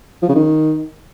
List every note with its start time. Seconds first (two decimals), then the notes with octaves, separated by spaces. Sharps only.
0.23 F3
0.29 C#3
0.35 D#3